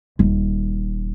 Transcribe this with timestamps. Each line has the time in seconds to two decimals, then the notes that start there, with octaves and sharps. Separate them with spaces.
0.19 D#1